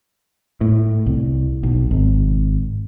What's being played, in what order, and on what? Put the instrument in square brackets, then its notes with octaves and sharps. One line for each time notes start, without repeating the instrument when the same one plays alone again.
[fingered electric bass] A2
C2
B1
G#1